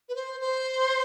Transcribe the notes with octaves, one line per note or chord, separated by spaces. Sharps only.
B4
C5
C5